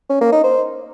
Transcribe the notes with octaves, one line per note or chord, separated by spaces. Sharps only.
C#4
A#3
D#4
C5